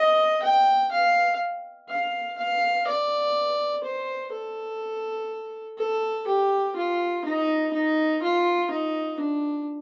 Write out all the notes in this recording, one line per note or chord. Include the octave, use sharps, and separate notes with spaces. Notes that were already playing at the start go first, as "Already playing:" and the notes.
Already playing: D#5
G5
F5
F5
F5
D5
C5
A4
A4
G4
F4
D#4
D#4
F4
D#4
D4